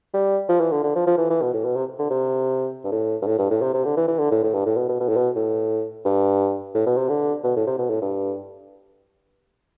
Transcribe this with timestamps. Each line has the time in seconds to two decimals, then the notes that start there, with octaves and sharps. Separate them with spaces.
0.14 G3
0.49 F3
0.60 E3
0.72 D3
0.83 D3
0.96 F3
1.07 F3
1.18 E3
1.30 E3
1.42 B2
1.53 A2
1.65 B2
1.76 C3
1.99 D3
2.10 C3
2.84 G2
2.92 A2
3.22 G2
3.26 A2
3.38 G2
3.50 A2
3.62 C3
3.74 C3
3.85 D3
3.97 E3
4.08 E3
4.19 D3
4.31 A2
4.43 A2
4.54 G2
4.66 A2
4.77 B2
4.89 B2
5.00 B2
5.08 A2
5.17 B2
5.36 A2
6.05 G2
6.74 A2
6.86 B2
6.97 C3
7.09 D3
7.44 B2
7.56 A2
7.67 C3
7.78 B2
7.90 A2
8.02 G2